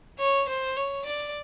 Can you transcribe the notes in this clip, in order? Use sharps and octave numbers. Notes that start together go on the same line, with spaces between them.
C#5
C5
C#5
D5